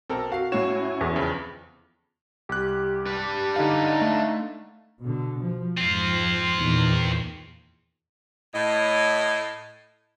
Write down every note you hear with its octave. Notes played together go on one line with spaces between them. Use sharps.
B1 C4 A4 A#4
F#4 F5 C7
A2 C#4 E4 F#4 C#5 G#5 E7
E2
F2 C#3
C2 G4 F#6
D4 B4
D3 D#4 F5
A3
B2 D3
F3
F2 G#2 F3 C4 F4
E2 A#2 D#3
A2 D#5